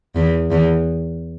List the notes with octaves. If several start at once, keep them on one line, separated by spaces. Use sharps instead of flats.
E2
E2